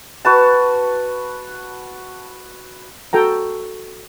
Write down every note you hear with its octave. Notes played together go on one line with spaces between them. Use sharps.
F#4 B4 A5
F#4 A4 G5 A#5